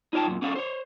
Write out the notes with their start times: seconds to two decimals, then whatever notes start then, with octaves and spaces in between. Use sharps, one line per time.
0.13 D#4 F4 C#5 G5 A5
0.27 F#2 A#2
0.42 C#4 D4 F#4 A4 F5
0.55 C5 C#5